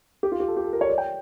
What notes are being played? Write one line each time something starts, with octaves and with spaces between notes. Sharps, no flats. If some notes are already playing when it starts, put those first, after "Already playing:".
G4
F4
G4
A4
G4
A4
A#4
C#5
D5
G5